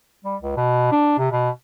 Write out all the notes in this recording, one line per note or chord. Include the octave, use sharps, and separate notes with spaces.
G3
C#2
B2
D4
C3
B2